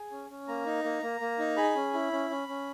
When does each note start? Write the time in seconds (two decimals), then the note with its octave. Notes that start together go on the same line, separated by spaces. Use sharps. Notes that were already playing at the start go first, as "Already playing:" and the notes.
Already playing: G#4
0.11 C#4
0.30 C#4
0.48 A#3 A#5
0.66 D#4
0.84 A#3
1.03 A#3
1.20 A#3
1.39 D#4
1.57 G#4 B5
1.75 C#4
1.94 E4
2.12 C#4
2.30 C#4
2.48 C#4